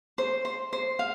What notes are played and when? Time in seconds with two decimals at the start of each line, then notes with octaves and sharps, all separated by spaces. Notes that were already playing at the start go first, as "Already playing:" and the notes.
0.18 C5
0.45 C5
0.73 C5
0.99 F5